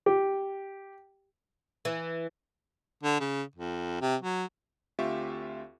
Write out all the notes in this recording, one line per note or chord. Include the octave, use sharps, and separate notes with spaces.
G4
E3
D3
C#3
F2
C3
F#3
D2 C4 F4 G4 E5 C#6